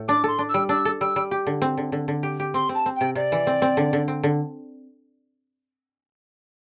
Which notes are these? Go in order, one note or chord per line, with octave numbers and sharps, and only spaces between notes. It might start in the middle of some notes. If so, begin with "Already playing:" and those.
Already playing: A2
D4 D6
A4 C6
D4
G3 E6
D4 E6
A4
G3 E6
G3
G4
D3
C4
D3
D3
D3
G4
G4
C4 C6
C4
A5
C4
C3 G5
C3 D5
E3
C4
C4
D3
D3
C4
D3